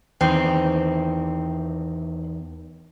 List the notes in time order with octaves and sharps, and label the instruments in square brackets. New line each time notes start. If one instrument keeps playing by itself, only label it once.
[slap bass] E2 D#3 [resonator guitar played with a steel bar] C4